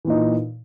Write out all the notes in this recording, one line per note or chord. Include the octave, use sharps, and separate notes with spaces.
A#2 E3 D#4